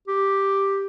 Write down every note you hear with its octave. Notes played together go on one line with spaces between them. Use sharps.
G4